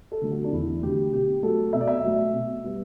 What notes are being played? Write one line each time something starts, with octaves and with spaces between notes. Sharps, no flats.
A4
D3 F#3 A3
F#4
D4
E2 E4
D3 F#3 A3 G4
B2 G4
F#3 A3 A4
B2 E5
D5
E5
F#3 A3
B2
G3 B3